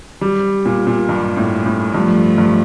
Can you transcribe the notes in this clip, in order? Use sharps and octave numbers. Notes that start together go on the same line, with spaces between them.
G3
A#2
A#2
G2
A2
A2
G2 F3 A3
G2